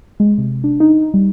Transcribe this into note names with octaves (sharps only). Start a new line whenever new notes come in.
G#3
C3
D4
D#4
G3